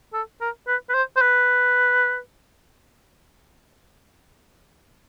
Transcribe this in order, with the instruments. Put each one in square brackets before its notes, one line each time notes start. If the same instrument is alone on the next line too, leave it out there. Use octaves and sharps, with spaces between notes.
[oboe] A4
A#4
B4
B4
C5
C5
B4